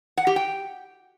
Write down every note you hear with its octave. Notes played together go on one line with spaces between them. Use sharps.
F#5
G4
G5